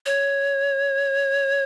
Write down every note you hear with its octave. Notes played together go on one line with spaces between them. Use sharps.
C#5